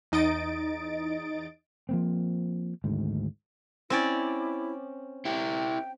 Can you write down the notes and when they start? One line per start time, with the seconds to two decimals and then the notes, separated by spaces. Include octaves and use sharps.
0.12 E2 D#4 D#5 A6 D7
1.89 F3 A#3 C4
2.84 G#1 D2 G#2
3.90 C4 C#4 E4 D5
5.25 E4 G4 G5